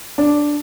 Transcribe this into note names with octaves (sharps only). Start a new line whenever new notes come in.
D4